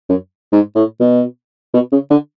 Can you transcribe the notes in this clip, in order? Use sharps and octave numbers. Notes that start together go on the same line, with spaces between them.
F#2
G#2
A2
B2
B2
C#3
D3